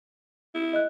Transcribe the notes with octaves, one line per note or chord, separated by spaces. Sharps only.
E4
D#5 F#6